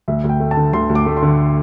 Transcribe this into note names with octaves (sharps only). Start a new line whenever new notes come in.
D2 E5
D2
G5
A3
A5
D3
D2 C6
D2
D6
A3
C6
D3